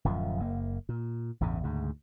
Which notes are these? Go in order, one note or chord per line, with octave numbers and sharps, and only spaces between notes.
D1 F#2 F3
F#1 A#3
A#2
A1 E2 G2 C#3
D2 G#2 C#3